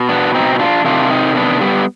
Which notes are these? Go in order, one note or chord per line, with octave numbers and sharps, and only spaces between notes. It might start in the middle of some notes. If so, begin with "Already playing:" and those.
Already playing: B2
B3 D4
C4 D#4
D#4
D4 F4
C3 D#3 D4 F4
C4 D#4
B3 D4
G3 B3